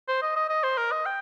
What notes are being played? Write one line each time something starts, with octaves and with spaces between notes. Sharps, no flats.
C5
D#5
D#5
D#5
C5
A#4
D#5
G5